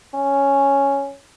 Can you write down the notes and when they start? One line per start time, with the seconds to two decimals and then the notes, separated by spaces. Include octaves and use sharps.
0.15 C#4